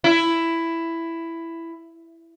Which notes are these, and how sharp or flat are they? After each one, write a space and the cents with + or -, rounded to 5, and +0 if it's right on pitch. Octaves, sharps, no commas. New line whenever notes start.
E4 +10